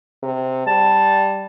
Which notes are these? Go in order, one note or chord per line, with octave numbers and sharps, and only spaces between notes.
C3
G3 A5